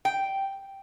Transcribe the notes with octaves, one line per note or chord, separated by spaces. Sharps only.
G5